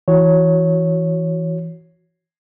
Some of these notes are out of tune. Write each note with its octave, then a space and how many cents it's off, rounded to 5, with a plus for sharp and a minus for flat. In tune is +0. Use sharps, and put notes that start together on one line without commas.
E3 +0 F#4 +0 C#5 +0